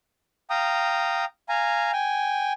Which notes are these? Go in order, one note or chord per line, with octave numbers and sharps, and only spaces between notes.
F5 G5 A#5 D#6
F5 G#5 A#5
G5 G#5